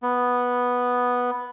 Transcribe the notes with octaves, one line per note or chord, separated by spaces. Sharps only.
B3